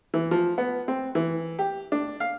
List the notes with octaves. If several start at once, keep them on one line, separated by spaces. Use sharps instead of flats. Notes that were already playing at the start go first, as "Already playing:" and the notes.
E3
F3
B3
C4
E3
G4
D4
F5